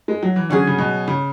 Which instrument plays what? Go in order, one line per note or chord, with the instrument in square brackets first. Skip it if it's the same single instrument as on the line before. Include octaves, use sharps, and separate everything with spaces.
[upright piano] G#3
F#3
E3
[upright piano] D3 [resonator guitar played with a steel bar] F#3 C#4 G#4
[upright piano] C#3
B2
C#3